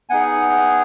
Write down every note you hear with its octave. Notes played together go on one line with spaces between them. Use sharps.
B3 D#4 G#4 F#5 G#5